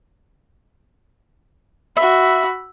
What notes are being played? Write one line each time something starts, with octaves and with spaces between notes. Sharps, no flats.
F#4 E5 B5